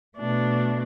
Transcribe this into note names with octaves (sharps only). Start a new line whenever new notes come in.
B2 A3 D4